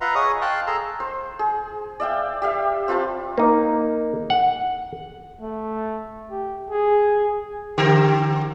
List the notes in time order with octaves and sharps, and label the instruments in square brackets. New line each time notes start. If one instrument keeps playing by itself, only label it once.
[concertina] F4 B4 E5 F#5 A#5 C6
G#4 C#5 D#5 C#6 D#6
F5 G5 A5 C6 F#6
G#4 A4 A#5 C6 E6
[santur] C5
G#4
D5 E5 F5 G5
G4 E5 F5
C4 F4 B4 A5
[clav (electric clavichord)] A#3 D#4
F#5
[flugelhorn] A3
G4
G#4
[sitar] D3 G4 A#4